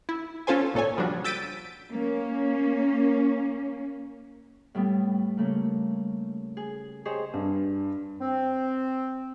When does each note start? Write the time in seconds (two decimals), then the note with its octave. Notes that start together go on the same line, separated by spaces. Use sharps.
0.09 E4
0.47 C#4 F4 A4 C5 G#5
0.74 G#1 A#2 A4 C#5 G#5
0.97 C#3 F3 G3 D4 F#4
1.24 E6 G6 A6 B6 D7 D#7
1.90 A#3 C#4
4.75 A2 G3 B3
5.37 C#3 A3 A#3
6.57 G#4
7.05 G4 G#4 C5 C#5 D#5
7.33 G2
8.20 C4